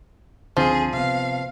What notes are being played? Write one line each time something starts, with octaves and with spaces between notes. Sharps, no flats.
C#2 D3 F3 C4 G#4
C3 B3 F5